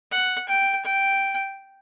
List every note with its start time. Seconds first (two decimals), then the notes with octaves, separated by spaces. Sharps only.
0.12 F#5
0.49 G5
0.85 G5